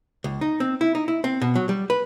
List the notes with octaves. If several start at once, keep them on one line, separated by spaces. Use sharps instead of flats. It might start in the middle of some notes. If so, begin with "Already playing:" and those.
C#2
D#4
C4
E4
D#4
E4
C4
B2
F#3
G3
B4